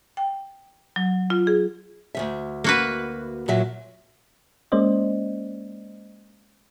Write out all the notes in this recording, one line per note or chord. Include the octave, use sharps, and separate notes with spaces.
G5
F#3
F4
G#4
D2 D#3 E5
A#3 F#4 B4
A#2 F#3 E5
G#3 A#3 C#4 C5 D5 D#5